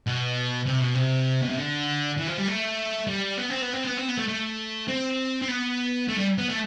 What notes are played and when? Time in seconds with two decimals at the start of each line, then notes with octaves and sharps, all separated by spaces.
0.07 B2
0.66 C3
0.81 B2
0.95 C3
1.42 B2
1.49 C3
1.57 D3
2.17 E3
2.27 F3
2.38 G3
2.48 A3
3.07 G3
3.37 B3
3.49 C4
3.62 B3
3.73 C4
3.85 B3
3.97 C4
4.08 B3
4.18 A3
4.28 A3
4.88 C4
5.42 C4
5.48 B3
6.09 A3
6.18 G3
6.38 B3
6.49 A3